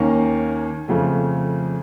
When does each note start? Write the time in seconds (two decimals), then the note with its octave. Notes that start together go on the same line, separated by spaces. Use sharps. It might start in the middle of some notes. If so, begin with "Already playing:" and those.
Already playing: D#2 D#3 A#3 C#4
0.88 F2 C#3 F3 A3